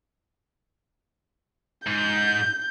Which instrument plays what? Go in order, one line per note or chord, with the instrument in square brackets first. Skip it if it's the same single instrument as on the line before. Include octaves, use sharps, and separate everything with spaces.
[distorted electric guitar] G#2 [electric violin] G6